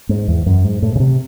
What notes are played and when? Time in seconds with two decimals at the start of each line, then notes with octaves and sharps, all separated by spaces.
0.09 G#2
0.28 E2
0.46 F#2
0.65 G#2
0.82 A2
0.96 C#3
1.00 C3